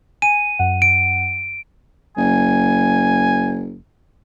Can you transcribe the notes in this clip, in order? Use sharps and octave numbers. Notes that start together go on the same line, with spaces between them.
G#5 D#7
F#2 F#5
D7
F#1 G#5